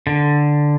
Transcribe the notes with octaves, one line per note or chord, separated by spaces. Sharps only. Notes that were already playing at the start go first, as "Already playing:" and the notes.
D3